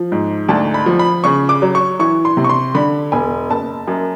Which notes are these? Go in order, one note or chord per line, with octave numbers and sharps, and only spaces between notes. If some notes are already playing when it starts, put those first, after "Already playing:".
Already playing: F3
G#2
D2 A5
B5
F3
B5
C#3 C#6
D6
F#3
C#6
E3 C#6
C6
C3
C#6
C6
D3 B5
E1 G#5
F#1 A5
F#2